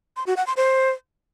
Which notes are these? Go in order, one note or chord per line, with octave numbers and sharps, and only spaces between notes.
C6
F#4
F#5
C6
C5